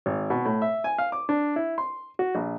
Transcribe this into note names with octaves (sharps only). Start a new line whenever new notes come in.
G#1
B2
A2
E5
G#5
F5
D6
D4
E4
C6
F#4
A#1